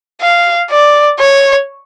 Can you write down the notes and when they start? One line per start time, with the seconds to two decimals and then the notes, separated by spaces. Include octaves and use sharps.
0.21 F5
0.70 D5
1.19 C#5